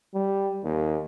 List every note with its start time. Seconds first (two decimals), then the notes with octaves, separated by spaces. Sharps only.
0.14 G3
0.64 D#2